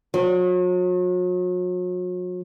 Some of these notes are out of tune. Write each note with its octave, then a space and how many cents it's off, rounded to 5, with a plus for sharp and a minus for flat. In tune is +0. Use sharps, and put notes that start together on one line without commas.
F#3 -40